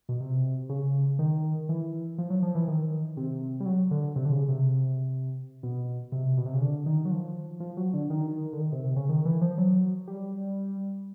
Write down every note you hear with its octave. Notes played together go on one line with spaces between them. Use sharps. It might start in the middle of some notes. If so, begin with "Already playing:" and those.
B2
C3
C#3
D#3
E3
F3
F#3
F3
E3
D#3
C3
G3
F#3
D3
C3
D3
C#3
C3
B2
C3
B2
C3
C#3
D3
D#3
F#3
F3
F3
F#3
D3
D#3
D3
D#3
C3
C3
C#3
D#3
E3
F3
F#3
G3